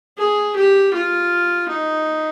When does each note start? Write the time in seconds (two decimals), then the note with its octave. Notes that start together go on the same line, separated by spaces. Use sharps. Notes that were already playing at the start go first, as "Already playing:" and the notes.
0.18 G#4
0.56 G4
0.94 F4
1.69 D#4